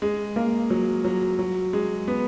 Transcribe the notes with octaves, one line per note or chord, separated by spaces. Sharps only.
G#3
A#3
F#3
F#3
F#3
G#3
B3